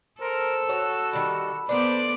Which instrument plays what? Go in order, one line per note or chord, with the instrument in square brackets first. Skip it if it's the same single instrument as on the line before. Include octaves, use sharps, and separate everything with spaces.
[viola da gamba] A4 [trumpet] A#4 [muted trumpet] C5
[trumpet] F#4 [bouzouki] C#5
[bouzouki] D#3 G3 [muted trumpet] B5
[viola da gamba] B3 D5 [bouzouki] D4 A4 A#4 [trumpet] C5